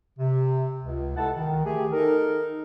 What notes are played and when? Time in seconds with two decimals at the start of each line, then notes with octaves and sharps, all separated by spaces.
0.19 C3
0.83 C#2
1.16 C3 E4 A4 F#5 A5
1.35 D#3
1.65 A3 G4 G#4
1.92 D#4 A4 A#4